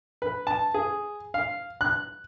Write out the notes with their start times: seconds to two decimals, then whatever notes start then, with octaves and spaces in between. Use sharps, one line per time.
0.22 B4
0.47 A5
0.74 G#4
1.34 F5
1.81 F#6